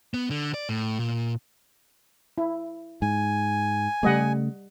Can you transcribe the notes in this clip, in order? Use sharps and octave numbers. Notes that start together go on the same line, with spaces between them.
B3
D3
D5
A2
A#2
E4
G#2 G#5
C#3 G3 A3 D#5 F#5